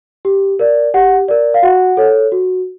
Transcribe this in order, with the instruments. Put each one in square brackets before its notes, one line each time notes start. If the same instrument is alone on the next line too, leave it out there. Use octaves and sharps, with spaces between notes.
[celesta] G4
A#4 D5
G4 F#5
A#4 D5
F5
F#4 F#5
A4 C#5
F#4